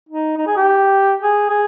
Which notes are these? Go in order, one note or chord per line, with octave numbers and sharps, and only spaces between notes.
D#4
D#4
G#4
G4
G#4
G#4